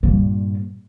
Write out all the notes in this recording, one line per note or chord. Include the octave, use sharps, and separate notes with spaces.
G2 A#2